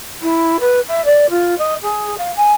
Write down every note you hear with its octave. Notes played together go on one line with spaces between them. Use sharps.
E4
B4
E5
D5
F4
D#5
G#4
F5
G#5